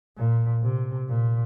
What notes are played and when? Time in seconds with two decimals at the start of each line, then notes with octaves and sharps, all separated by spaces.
0.17 A#2
0.63 C3
1.08 A#2